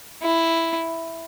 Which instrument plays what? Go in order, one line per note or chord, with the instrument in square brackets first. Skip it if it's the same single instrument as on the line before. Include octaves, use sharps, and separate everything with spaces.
[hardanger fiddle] E4